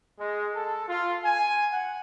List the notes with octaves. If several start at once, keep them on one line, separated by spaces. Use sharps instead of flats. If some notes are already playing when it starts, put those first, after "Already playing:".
G#3
A4
F4
G#5
F#5